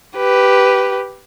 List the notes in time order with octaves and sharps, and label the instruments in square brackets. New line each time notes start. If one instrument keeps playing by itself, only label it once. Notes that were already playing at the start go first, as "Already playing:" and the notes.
[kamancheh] G4 B4